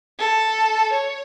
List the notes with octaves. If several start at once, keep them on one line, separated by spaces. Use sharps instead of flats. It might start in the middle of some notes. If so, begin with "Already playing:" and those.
A4
C#5